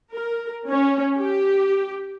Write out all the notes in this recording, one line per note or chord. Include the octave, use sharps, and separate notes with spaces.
A#4
C#4
G4